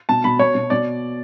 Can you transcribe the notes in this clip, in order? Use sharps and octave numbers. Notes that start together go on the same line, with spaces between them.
B2 A5
B2 B5
B2 C#5
B2
B2 D5